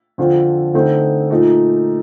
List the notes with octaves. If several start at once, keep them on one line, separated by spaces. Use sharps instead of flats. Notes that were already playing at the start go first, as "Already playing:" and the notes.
F2 D3 F3 C4 F4
D3 A3 C4 D#4
A#2 A3 D#4